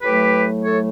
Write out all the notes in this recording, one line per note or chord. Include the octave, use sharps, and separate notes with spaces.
A2 F#3 A3 G4 B4
A4 C#5